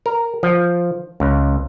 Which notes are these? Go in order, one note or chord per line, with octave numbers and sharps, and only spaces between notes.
A#4
F3
C#2